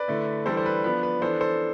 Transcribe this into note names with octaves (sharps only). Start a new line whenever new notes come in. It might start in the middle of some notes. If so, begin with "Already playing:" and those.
Already playing: B4 D5
D3 A3 E4
E3 G3 D4 A4 C5
C5
B4
F3 B3 D4 B4
B4
E3 B3 D4 A4 C5
A4 C5